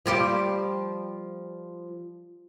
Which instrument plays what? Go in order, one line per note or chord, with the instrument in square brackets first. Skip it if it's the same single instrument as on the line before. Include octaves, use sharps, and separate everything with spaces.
[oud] F3 G3 G4